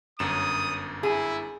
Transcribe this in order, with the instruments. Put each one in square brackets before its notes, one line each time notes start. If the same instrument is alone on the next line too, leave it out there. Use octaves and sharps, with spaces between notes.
[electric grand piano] G1 F#2 E7 [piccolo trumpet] D#6
[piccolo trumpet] E4 [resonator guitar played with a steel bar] G#4